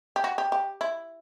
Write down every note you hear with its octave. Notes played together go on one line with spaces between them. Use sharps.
G4
F#4
G4
G4
E4